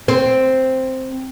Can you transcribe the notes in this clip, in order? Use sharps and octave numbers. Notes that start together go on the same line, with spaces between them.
C4